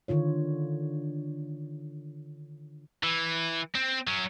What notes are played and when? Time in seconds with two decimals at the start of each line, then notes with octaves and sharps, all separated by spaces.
0.08 D3 D#3 F4 C#5
3.03 E3
3.75 C4
4.07 F#3 C#4